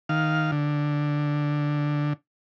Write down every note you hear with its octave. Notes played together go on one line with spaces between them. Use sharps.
D#3 F5
D3